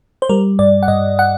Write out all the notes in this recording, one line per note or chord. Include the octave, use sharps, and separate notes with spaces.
C5
G3 A#4
G2 D5
F#5
G2 D#5
F#5